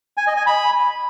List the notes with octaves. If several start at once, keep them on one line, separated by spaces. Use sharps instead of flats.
G#5
D#5
G#5
B5